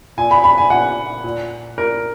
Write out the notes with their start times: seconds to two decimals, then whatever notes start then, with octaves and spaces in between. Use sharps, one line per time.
0.17 A#2 G#5
0.31 B5
0.44 B5
0.58 G#5
0.70 A#2 F#5
1.24 A#2
1.78 A#2 A#4